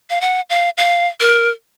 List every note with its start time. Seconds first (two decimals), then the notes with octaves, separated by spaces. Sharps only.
0.10 F5
0.21 F#5
0.50 F5
0.78 F5
1.20 A#4